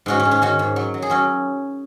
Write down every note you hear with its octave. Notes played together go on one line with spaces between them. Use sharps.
G#2 C#4 F#4
C#4
G#2
C#4
D#3 C#4 F#4
G#2
F#3
F#3
G#4
F#3 C#4 F#4